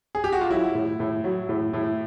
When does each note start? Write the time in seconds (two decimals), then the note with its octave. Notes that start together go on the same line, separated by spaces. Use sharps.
0.15 G#4
0.24 G4
0.32 F#4
0.41 F4
0.50 F#3 E4
0.75 A2
1.00 A2
1.24 F#3
1.49 A2
1.73 A2